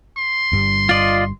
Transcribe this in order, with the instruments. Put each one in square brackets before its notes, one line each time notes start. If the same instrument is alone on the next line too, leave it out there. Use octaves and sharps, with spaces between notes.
[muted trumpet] C6
[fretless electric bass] G1 G2 G3
[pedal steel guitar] F4 D5 D#5